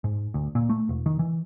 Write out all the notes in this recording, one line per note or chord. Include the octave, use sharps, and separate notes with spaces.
G#2
D2
A#2
A3
E1
D#3
E3